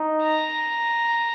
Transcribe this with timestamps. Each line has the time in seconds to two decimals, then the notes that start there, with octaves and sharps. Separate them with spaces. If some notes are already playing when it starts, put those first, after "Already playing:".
Already playing: D#4
0.23 A#5